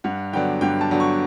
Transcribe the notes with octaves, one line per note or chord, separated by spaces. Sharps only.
G2 F#5
D3 F#3 B3 D4 G5
G2 G5
A5
D3 F#3 B3 D4
C#6